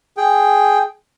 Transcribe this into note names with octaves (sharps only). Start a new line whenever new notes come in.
G#4 G5